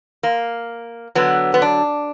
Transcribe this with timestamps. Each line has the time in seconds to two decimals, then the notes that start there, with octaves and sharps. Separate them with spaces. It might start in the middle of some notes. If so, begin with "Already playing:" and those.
0.23 A#3
1.15 D3 F#3 B3
1.54 B3
1.62 D4